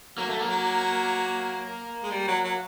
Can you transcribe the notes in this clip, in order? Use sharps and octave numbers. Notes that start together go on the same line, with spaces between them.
F#3 A#3
A3
A#3
F#3
G#3
G3
F#3
F#3